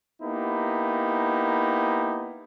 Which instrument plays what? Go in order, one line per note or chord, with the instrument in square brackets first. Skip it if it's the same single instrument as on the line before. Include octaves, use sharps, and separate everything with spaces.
[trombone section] A#3 B3 D#4 E4 G4